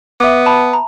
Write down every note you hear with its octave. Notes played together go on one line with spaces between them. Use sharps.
B3 E5 D6
A5 B5
A#5